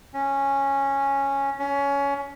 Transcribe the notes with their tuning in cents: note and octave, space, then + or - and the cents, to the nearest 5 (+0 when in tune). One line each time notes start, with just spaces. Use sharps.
C#4 -10
C#4 +20